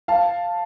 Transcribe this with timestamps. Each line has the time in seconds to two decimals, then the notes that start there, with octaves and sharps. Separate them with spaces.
0.08 F5 A5